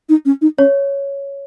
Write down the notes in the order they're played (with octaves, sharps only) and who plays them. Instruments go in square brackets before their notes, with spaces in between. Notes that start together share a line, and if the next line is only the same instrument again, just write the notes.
[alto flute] D#4
C#4
D#4
[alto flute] C#4 [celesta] C#5